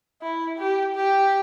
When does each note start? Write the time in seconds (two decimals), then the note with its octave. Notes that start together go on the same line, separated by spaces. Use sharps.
0.22 E4
0.59 G4
0.95 G4